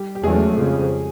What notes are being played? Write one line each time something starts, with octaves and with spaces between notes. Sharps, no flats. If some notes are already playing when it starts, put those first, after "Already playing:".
Already playing: G3 G4
G4
E2 C#3 F#3 G#3 A3 G#4
F2 C#3 F3